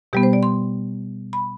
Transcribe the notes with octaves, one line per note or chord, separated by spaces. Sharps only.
B2 G3 B3 G4
C5
D5
C6
B5